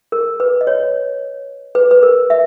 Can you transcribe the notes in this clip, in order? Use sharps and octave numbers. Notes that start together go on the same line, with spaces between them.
A#4
B4
D#5
C#5
B4
B4
A#4
E5